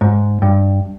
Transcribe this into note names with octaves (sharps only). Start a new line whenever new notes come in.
G#2
G2